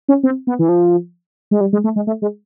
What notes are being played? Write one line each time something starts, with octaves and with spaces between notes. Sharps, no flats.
C#4
C4
B3
E3
F3
G#3
G3
G#3
A3
G#3
A3
G#3